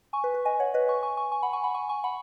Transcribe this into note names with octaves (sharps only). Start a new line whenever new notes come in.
G#5 C#6
B4
B4
D#5 G#5
C#5 F#5
B4 D#5
G#5 C#6
G#5 C#6
G#5 C#6
G#5 C#6
F#5 B5
G#5 C#6
F#5 B5
G#5 C#6
G#5 C#6
F#5 B5